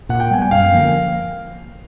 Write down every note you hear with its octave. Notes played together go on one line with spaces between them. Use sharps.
A#2 F#5
G5
G3 B3 G#5
G5
F#2 F5
D3 F3 A#3